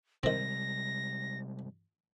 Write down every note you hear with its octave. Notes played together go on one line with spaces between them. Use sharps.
C3 D#3 G3 G#3 C4 A#6